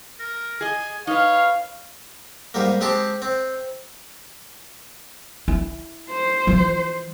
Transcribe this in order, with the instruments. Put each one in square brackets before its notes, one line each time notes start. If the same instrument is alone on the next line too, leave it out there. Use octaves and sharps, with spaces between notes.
[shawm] A#4
[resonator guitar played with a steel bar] G#4 D#5 [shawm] G#5
[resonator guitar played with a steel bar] D#4 B4 [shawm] C#5 [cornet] F5
[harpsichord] G#2 G3 A#3
G#3 C4 G4 A5
C4
[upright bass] E4
[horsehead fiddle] C5
[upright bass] E3 F3